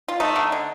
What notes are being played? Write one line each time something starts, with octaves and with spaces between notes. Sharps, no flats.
F4
A3 D#4
D3
D3